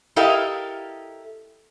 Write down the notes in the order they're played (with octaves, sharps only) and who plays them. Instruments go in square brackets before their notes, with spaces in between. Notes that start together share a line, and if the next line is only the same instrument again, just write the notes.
[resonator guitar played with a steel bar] E4 G4 A4 A#4 D#5 F5